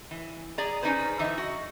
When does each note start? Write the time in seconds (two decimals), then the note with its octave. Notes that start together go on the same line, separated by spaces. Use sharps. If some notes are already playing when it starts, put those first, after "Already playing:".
0.11 E3
0.58 G#4 D5 A#5
0.82 C#4 D#4 G#4 B4 C5
1.19 D3 E3 D#4 E5
1.38 F#4